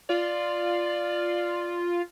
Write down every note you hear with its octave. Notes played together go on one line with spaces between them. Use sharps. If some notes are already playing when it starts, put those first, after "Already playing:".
F4 D5